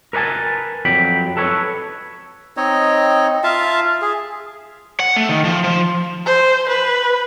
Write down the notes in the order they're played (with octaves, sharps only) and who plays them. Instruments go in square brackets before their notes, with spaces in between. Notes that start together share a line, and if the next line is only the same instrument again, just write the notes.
[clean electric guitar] A#4 B4 C#5 G#5 A5
F2 F#3 G5 B5
A4 B4 C#5
[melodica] C4 D#4 C#5 D#5
F4 E5 F5 A5
G#4
[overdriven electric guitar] F#5
A3
D#3
F3
F3
[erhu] C5
B4